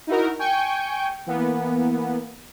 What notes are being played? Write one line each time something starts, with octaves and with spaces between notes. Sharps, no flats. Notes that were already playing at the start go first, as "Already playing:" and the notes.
D#4 E4 F#4 A#4
G5 G#5 C#6 G6
E3 A#3 B3